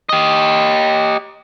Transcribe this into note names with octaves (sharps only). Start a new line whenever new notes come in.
G4 D#5